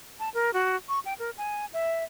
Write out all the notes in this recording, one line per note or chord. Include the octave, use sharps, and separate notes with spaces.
A5
A#4
F#4
C#6
G5
A#4
G#5
E5